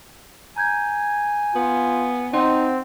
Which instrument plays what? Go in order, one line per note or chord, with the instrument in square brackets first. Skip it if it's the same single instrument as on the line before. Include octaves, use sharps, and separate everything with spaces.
[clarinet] G#5 [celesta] A#5 G6 G#6
[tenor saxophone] B3 [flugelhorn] F4
[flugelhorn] C4 [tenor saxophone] D#4 [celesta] F#5 C6